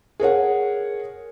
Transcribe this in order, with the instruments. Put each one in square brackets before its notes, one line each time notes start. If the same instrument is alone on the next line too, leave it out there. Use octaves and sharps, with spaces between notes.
[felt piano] G#4 A#4 C#5 F#5